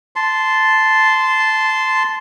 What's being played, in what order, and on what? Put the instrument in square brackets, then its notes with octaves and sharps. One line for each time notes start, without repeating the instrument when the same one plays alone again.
[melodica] A5 C6